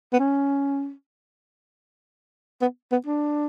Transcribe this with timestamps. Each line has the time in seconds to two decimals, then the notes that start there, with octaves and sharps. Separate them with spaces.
0.13 B3
0.19 C#4
2.62 B3
2.92 B3
3.06 D4